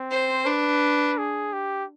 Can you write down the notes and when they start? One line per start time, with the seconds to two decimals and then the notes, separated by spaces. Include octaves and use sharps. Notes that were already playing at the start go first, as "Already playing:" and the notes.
Already playing: C4
0.11 C5
0.46 D4 B4
1.18 G#4
1.53 G4